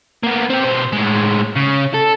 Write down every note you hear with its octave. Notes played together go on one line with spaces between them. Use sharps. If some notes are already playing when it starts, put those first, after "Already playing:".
A#3 B3
C4 G4
B2 C5
A2 G#3
C#3
A4